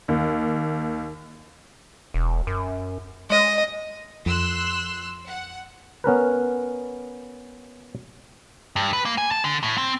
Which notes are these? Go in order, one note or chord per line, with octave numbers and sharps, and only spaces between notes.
D#2
E1
F#2
G#3 D#5
F2 C6 E6 F#6
F#5
B3 C#4 A#4 B4
G2
B4
A#3
G#5
A5
D3
A2
C4